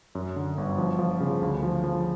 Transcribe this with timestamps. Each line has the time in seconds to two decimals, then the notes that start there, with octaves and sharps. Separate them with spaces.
0.15 F#2
0.36 D3
0.58 G1
0.78 F3
0.99 F3
1.20 C#3
1.42 D2
1.63 F3
1.84 F3